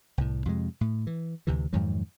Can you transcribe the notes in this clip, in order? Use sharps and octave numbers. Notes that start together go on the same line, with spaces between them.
C2 A2
F2 C3 G#3
A2
E3
D2 C3 E3
F2 G#2 D#3 F#3